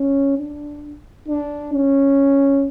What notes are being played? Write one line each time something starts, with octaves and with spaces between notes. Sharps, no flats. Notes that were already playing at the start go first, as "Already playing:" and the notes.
Already playing: C#4
D4
D4
C#4